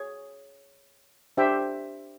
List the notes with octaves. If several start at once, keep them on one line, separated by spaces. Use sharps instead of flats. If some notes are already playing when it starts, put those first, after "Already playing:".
Already playing: G#4 C#5
D4 G4 C5 E5 G5